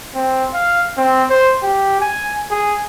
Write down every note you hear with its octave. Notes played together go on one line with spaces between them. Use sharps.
C4
F5
C4
C5
G4
G#5
G#4